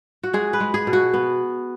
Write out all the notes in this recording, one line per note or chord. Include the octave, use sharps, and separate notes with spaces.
F#4
G#3 G#4
B4
G#3
G#4
B2
F#4
B3